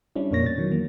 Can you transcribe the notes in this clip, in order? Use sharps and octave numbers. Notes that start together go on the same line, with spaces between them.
G3 C#4 D4 E4
F2 A#2 A#3 C#5 A#6
B2 A6
D#3 E3 F#3
A#3